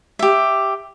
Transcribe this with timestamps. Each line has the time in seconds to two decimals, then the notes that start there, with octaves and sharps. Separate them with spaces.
0.19 G4 E5